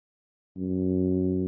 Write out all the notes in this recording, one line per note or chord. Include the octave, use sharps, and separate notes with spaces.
F#2